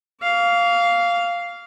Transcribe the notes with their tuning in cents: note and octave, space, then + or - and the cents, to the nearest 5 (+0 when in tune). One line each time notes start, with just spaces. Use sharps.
F5 +0 D6 -45